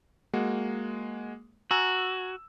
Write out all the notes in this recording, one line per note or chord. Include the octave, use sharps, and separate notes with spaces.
G#3 A#3 F#4
F#4 G#5 A#5 E6